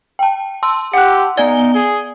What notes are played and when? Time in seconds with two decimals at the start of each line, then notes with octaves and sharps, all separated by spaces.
0.19 G5 A5
0.63 A5 C6 E6
0.94 G4 F#5 F#6
1.37 B3 D#4 D5 G#5 G#6 G7
1.74 G#4